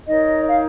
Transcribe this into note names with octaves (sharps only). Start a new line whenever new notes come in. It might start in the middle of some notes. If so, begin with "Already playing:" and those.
D#4 A#4 C#5 D#5
F5